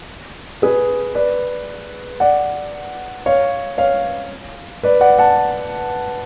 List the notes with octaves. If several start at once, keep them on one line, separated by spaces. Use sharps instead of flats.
G#4 B4
B4 D5
D5 F#5
C#5 F5
C#5 F5
B4 D5
D5 F#5
F#5 A5